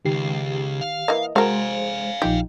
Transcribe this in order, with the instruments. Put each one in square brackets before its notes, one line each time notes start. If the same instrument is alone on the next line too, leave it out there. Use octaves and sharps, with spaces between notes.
[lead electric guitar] C#2 [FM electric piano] D#3 G4 C7
[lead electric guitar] F5
[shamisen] E3 A#3 [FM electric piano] D#5
[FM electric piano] G#3 C5 [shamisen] F#4 A#4 [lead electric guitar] F5 G#5
[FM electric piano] A#1 F3 D#4 [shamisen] G4